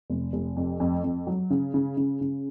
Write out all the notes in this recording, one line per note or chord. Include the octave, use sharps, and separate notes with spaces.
F1
F1
F2
F2
F2
F#3
C#3
C#3
C#3
C#3